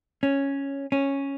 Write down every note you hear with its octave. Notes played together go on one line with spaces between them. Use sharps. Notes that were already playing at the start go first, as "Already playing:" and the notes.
C#4
C#4